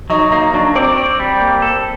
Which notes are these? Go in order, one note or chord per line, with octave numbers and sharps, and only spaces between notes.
F#3 D#4
A#3 D#4
F#3 D4
C4 D5
D5
G3
A#3
A4